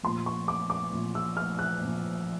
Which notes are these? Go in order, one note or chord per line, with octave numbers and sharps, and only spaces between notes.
A#2 F3 C6
C#6
D6
D6
A#2 F3
E6
F6
F#6
A#2 F3